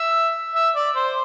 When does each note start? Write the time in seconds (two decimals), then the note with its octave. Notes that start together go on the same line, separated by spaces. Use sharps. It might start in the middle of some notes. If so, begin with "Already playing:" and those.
Already playing: E5
0.55 E5
0.75 D5
0.96 C5